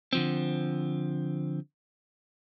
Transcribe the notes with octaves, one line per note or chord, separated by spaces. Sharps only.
D3 F3 C4